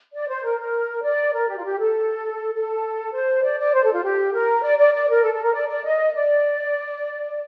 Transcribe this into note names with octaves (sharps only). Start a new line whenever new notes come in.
D5
C5
A#4
A#4
D5
A#4
G4
F4
G4
A4
A4
C5
D5
D5
C5
A4
F4
G4
A#4
D5
D5
D5
A#4
A4
A4
A#4
D5
D5
D#5
D5